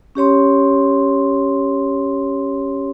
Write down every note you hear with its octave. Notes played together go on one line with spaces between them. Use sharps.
C#4 G4 C#5 C6